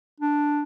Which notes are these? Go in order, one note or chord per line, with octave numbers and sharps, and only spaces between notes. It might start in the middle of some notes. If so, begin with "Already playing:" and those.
D4